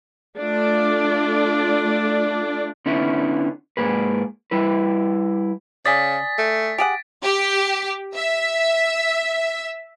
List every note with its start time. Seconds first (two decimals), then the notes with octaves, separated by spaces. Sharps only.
0.37 A3 D4 F4 D5
2.86 D3 B3 C#4 D#4 E4
3.77 G#2 B2 A#3 G#4 B4
4.51 G3 E4 B4
5.86 C#3 D5 G#5 D#6 A6 B6
6.38 A3
6.78 G4 G#4 F#5 D7
7.23 G4
8.15 E5